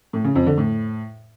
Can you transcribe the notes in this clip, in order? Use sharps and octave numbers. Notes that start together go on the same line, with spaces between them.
A2
C#3
F2
D3
A2